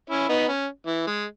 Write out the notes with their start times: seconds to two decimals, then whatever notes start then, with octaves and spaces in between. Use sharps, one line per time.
0.10 C#4 E4
0.29 B3 D#4
0.48 C#4
0.87 E3
1.07 G#3